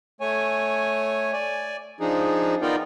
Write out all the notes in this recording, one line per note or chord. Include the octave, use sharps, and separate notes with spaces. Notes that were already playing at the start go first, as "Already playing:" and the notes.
A3 C#5 G#5
D5 G#5
F3 D4 D#4 G#4
B3 D#4 F4 A#4 D5 G5